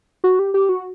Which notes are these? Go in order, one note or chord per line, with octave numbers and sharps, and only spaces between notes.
F#4
G4
G4
F#4